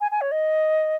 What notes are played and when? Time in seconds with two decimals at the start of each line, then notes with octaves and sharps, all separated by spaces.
0.01 G#5
0.11 G#5
0.21 C#5
0.32 D#5